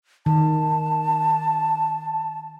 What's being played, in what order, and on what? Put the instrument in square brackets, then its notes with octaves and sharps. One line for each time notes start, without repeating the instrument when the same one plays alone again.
[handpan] D#3 [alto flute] A5